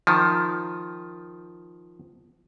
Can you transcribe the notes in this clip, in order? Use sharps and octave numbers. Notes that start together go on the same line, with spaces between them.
D#3 F3